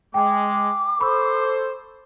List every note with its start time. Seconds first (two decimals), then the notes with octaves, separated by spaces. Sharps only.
0.14 G#3 G5 G#5 D6
1.01 A4 C5 B5 C#6 E6